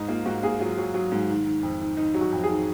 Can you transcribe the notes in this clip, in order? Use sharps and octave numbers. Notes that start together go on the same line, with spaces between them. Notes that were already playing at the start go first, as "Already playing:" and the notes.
Already playing: G#2 D#4
A#3 F4
G#2 F#4
A#3 G#4
F#3 F4
F#3
F#3
G#2
D#3
D#3
F2
D#3
D#3 D#4
F#3
F#4
F2
D#3 G#4